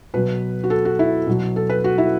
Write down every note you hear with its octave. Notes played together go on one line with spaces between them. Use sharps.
B2 F#3 B4
F#4
A4
F#4
E4
B2 F#3
A4
B4
F#4
E4